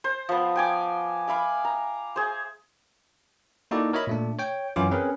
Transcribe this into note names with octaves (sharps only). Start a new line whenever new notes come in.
C5
F3 B3
G5 G#5 D6
E5 F5 B5 D6
A#5
G#4 C5
A#3 D#4 E4 F#4 A4 D5
A#4 C#5 D#5 E5 B5
A#2 A3 D4
C#5 G5
F#2 E3 C#4 E4 F4 D6
C4 C#4 G#4 A#4 B4